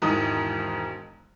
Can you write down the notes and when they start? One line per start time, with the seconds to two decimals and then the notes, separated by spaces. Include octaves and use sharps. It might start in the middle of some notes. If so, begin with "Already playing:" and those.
0.02 E1 G#2 D#3 E3 D#4 D#6